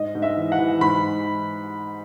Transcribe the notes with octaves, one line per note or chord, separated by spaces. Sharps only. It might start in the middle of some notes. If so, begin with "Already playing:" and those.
Already playing: G#2 D#5
G#2
E5
E3
F#5
E3
G#2 B5